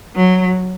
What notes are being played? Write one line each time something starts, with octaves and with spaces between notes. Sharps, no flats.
F#3